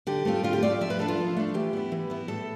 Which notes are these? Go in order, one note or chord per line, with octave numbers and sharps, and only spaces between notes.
D3 G4
A3 C4 F4
D3 F4
G4
A3 C4 F4 D5
F3 E5
B4
A3 D4 A4
F4
F3
A3 D4
E3 G4
B3 E4
E3
B3 E4
A2 A4